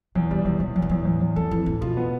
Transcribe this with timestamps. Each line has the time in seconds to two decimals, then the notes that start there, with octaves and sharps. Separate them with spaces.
0.15 E2 B2
0.31 B2 G3
0.45 E2 C3
0.60 E2 B2
0.76 E2 A2
0.82 B2
0.90 E2 A2
1.05 E2
1.21 E2
1.36 F2 A4
1.51 F2 E3
1.66 A2 E3
1.81 B2 F4
1.97 B3